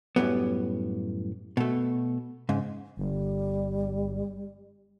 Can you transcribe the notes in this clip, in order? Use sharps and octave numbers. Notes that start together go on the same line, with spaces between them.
F#2 A2 G3 B3
B2 A3
G#2 C#3
G1 G3